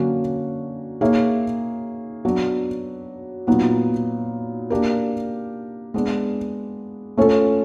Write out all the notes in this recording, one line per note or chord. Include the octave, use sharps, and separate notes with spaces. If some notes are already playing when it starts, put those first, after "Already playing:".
Already playing: D3 F#3 A#3 C#4 F#4
A#3 D#4 G#4 C#5 E5
F#3 B3 D4
A#2 F#3 B3 D#4
A#3 D4 G4 A#4
G#3 B3 D4
A3 C#4 F4 A4